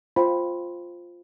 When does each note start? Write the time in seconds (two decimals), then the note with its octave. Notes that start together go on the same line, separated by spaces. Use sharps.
0.16 F4 C5 G5 B5